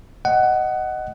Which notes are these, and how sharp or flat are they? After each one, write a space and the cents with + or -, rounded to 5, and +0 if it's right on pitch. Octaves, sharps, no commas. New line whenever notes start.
D#5 +0 F#5 +15